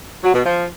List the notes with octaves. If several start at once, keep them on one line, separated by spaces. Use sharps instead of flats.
F#3
B2
F3